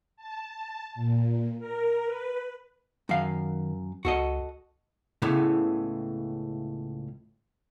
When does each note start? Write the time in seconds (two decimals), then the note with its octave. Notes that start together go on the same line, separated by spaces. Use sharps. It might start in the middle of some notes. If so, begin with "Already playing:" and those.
0.17 A5
0.95 A#2
1.59 A#4
2.05 B4
3.09 F#2 D#3 F5
4.05 C#2 F#4 A4 D#5
5.22 C#2 A2 C#3 E3 B3